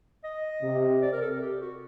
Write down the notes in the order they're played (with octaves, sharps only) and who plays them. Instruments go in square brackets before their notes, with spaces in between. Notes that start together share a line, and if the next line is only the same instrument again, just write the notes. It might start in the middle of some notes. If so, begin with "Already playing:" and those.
[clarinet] D#5
[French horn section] C3
[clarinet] D5
A#4
A4
A#4
G4
F#4